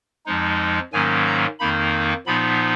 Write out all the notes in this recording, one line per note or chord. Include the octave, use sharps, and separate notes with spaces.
F2 F3 G#3 D#4
G#2 D#3 F#3 A#3 C#4 G#5
A#5
F2 D#3 A#3 D#4 B5
A#2 F3 B3 D#4 B5